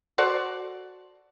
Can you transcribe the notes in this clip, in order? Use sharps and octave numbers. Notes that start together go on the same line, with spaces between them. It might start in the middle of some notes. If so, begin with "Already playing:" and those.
F#4 A4 C5 D5